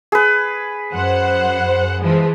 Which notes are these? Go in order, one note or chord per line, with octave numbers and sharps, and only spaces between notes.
G#4 B4
F#2 C5 F#5
E3 F3 G#3